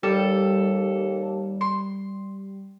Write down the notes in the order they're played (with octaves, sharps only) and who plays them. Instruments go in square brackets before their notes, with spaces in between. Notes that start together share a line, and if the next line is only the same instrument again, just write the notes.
[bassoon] D#2 [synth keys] G3 [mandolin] A4
[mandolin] C6